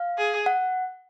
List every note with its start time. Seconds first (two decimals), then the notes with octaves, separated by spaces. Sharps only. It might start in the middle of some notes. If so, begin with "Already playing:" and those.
Already playing: F5
0.18 G#4
0.46 F#5